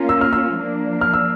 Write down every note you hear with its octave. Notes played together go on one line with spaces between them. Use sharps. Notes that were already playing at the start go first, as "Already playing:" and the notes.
Already playing: A#3 C#4 F4
E6
F6
E6
F3 A#3 D4
F6
E6